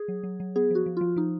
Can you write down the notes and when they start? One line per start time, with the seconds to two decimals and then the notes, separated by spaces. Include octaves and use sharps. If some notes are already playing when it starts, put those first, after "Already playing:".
Already playing: G#4
0.08 F#3
0.23 F#3
0.40 F#3
0.56 B3 G#4
0.71 F3 F#4
0.86 F3
0.97 F3 F4
1.16 F3 D#4